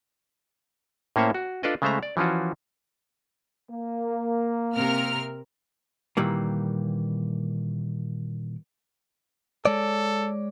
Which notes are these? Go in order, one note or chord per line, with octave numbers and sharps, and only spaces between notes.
A2 A#3 C#4 C5 C#5 E5
F#4
D4 F4 A4 B4 D5 D#5
C#3 G#3 A3 C5 E5 A#5
D5
E3 F3 C#4 F4 F#4
A#3
C3 A#4 F6
A#2 D#3 E3 G3 A#3
G#3 A4 C#5 D5